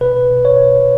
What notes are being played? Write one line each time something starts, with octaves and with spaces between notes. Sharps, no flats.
B2 B4
B2
C#5